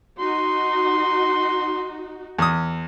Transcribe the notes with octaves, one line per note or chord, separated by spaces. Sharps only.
D#4 F#4 C6
E2 D#6